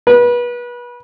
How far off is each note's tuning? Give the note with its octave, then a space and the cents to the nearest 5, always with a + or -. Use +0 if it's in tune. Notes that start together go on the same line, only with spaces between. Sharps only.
B4 -30